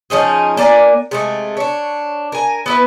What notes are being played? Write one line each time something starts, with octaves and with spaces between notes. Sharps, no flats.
F3 C#4 D#4 G#4
A#3 D4 D5 G#5
C3 G#3 A3
D4 C#5
A#4 G#5
B3 E4 B4